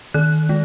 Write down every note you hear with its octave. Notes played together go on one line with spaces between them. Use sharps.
D#3 F#6
G#3